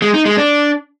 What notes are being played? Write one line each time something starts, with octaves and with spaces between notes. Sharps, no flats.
G#3
D#4
G#3
D4